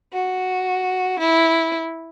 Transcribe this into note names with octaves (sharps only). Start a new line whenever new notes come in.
F#4
E4